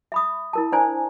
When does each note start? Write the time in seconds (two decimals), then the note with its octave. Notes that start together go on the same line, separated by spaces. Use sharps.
0.12 E5 B5 D#6
0.53 E4 A#4 A5
0.72 D4 C5 D5 G#5 A#5